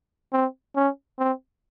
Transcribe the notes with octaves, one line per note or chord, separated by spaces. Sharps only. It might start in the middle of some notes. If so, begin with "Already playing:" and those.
C4
C#4
C4